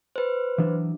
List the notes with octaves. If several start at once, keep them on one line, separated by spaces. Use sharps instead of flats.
B4 C5
E3 F#3 D4